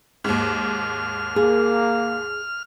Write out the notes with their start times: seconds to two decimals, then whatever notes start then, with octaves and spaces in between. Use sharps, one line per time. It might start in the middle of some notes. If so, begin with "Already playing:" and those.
0.24 D#2 G#2 F6
1.36 A#3 G#4